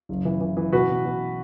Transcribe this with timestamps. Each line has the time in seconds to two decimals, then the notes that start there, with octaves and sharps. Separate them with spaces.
0.09 F#1
0.25 E3
0.41 E3
0.57 E3
0.72 B2 F#4 B4
0.89 B2
1.05 B2